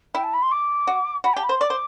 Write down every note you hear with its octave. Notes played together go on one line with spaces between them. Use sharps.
E4 G5
A5
B5
C6
D6
F#4
F#4 B5
G5
G4 A5
B5
C5 C6
D5 D6
C5